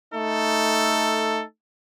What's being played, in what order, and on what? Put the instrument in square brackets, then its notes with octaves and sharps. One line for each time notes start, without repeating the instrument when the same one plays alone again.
[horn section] A3 D#4 A4